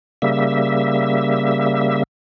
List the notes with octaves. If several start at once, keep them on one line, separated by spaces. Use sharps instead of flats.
C#3 G3 A#3 E5